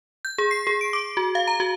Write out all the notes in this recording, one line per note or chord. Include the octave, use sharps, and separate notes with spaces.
G6
G#4
C7
G#4
D7
D6
F#4
F5
A#5
F#4